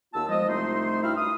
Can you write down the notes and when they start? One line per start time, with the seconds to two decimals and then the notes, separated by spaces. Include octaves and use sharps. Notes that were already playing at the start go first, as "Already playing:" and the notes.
0.14 D#2 B3 F4 A5 E6
0.28 F3 G#3 D#5
0.48 C2 A3 D#4 F4 C5 C6
1.03 G2 E4 F#4 E5 E6 F6
1.17 D#6